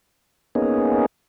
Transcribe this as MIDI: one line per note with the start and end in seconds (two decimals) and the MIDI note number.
0.55 1.06 58
0.55 1.06 59
0.55 1.06 61
0.55 1.06 63
0.55 1.06 68